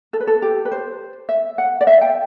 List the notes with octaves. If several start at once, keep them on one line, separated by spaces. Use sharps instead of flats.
A4
B4
A4
G4
B4
C5
E5
F#5
D5
E5
G5